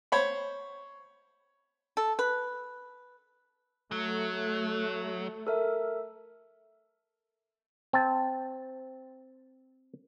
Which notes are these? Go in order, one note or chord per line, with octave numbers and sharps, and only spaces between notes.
C5 C#5 B5
A4
B4
F#3 A3
A4 A#4 E5
C4 A5